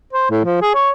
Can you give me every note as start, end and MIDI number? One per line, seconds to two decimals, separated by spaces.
0.13 0.26 72
0.30 0.40 45
0.45 0.60 53
0.62 0.72 68
0.75 0.91 73